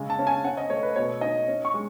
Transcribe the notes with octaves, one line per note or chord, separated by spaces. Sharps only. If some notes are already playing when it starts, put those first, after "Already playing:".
Already playing: C#3 G#3
A5
C#4
G#5
C#4 F#5
D#5
A3 C#5
B4
B2 C#5
D#4 D#5
C#4
C#6
G#3